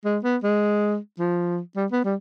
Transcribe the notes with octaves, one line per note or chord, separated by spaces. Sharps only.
G#3
B3
G#3
F3
G3
B3
G3